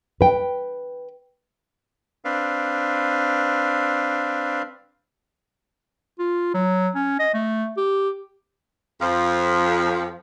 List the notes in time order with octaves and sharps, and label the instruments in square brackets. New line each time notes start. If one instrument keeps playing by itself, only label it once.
[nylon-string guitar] B4 G5
[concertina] C4 D4 B4 F5
[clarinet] F4
F#3
C#4
D#5
A3
G4
[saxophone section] F2 F3